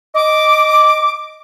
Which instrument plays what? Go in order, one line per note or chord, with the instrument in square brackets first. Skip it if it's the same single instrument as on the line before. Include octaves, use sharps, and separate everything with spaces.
[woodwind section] D#5 D6